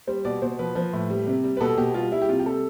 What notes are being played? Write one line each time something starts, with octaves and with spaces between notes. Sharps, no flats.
G3 C5
B2 D5
B2 C5
F3 B4
F3
A2
G3
C3
G3
B4
B2 A4
B2 G4
G3 F4
G3 E4
G4
C3 F4
G4
G3 A4